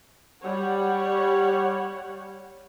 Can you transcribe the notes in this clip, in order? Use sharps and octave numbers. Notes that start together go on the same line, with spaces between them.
G3 C#5 F#5